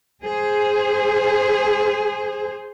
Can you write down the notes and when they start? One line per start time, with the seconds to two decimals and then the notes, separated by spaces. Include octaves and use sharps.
0.24 G#4 C5